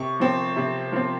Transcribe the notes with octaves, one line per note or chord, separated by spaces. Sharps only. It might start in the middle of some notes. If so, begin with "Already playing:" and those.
Already playing: C3 C#6
F3 C4
C3
F3 C4